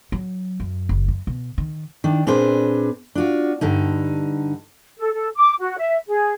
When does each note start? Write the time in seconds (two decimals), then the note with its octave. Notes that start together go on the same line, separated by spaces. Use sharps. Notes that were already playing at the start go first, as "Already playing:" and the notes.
0.12 F#3
0.60 F#2
0.89 F#1
1.08 F#2
1.27 B2
1.58 D#3
2.04 D#3 D4
2.27 A#2 C4 D4 G#4 B4 C5
3.15 D4 F4 F#4
3.61 G2 D3 D#4
4.98 A4
5.13 A4
5.35 D6
5.59 F#4
5.78 E5
6.07 G#4